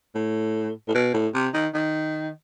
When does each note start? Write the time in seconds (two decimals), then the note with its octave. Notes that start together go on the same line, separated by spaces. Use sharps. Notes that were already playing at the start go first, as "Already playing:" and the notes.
0.15 A2
0.88 A2
0.95 B2
1.14 A2
1.34 C3
1.54 D#3
1.74 D#3